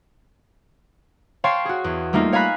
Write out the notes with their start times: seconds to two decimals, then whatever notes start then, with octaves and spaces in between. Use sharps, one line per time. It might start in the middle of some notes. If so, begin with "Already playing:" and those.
1.44 C#5 F5 G5 A5 C6 C#6
1.65 F#4 G#4
1.84 E2
2.13 G3 A3 A#3 D#4 F4
2.32 C#5 F5 G#5 A#5 B5 F#6